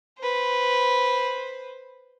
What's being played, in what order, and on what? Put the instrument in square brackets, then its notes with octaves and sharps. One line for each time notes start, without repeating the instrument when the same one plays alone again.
[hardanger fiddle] B4 C5